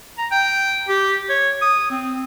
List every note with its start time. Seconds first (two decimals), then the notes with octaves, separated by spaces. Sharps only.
0.18 A#5
0.31 G5
0.88 G4
1.29 C#5
1.62 D#6
1.90 C4